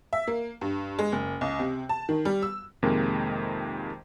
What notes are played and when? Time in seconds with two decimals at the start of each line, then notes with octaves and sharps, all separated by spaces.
0.13 E5
0.27 A#3
0.61 G2
0.99 G#3
1.12 F#1
1.41 C#2
1.59 C3
1.89 A5
2.09 D#3
2.25 G3
2.42 E6
2.83 F2 C3 D#3 G#3 A#3